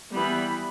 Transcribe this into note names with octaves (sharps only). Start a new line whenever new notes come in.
E3 G3 B3 B5